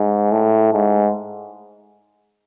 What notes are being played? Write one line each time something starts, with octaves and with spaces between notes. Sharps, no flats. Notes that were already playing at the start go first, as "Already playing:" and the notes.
Already playing: G#2
A2
G#2